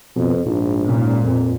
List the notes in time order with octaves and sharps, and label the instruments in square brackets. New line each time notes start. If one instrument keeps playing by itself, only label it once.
[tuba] F2 [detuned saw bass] B2
[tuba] A#1 [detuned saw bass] G#2
[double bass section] A#2 [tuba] C#4
[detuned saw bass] F2 [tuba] C4